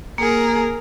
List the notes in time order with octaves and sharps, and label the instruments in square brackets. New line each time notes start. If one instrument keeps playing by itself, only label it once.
[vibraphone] A#3 [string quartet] G#4 A#4